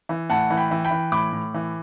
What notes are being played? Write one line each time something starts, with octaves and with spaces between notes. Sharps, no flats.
E3
A2 F#5 A5
E3
G5 B5
E3
G5 B5
E3
A2 B5 D6
A2
E3